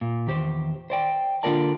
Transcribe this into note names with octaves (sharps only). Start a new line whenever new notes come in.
A#2
E2 D#3 G4 C5
C5 D5 G5
D3 A#3 F4 A#4 D5 A5